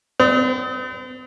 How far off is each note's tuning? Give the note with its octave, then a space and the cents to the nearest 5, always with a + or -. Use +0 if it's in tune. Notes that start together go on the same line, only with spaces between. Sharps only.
C4 -45